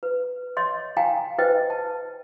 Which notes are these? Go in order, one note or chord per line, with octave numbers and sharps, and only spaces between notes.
B4
C#5 D#5 C6
F5 G5 G#5 A#5
B4 C5 D#5 G5
A5